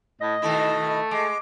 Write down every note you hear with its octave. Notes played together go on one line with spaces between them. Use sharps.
A2 D#5
B2 D#3 A3 E4
G#3 D6